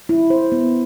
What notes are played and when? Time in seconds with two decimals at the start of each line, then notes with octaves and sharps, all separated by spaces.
0.09 E4
0.30 C5
0.52 B3